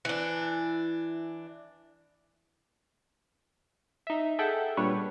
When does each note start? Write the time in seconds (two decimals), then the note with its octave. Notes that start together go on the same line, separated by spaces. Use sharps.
0.05 E3 D4
4.07 D#4 E5
4.39 G#4 A4 E5 F#5 G5
4.77 A#2 G3 D4 B4 C#5